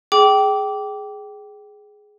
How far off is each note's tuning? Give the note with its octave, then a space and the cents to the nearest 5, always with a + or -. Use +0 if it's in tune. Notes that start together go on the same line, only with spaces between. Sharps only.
G#4 +10 G5 -20 D6 -15